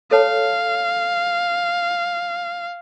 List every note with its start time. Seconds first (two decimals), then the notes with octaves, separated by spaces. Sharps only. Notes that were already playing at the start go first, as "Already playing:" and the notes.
0.11 A4 C#5 F5 A5